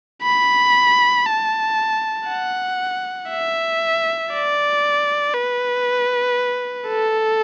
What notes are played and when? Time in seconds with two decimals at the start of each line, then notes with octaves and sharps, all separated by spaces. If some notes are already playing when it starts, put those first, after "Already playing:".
0.23 B5
1.26 A5
2.28 F#5
3.29 E5
4.32 D5
5.34 B4
6.88 A4